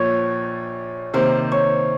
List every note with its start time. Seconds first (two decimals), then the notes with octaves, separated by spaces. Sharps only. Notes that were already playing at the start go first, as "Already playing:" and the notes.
Already playing: A#1 A#2 F3 C#5
1.14 C3 D#3 A#3 C5
1.52 C#5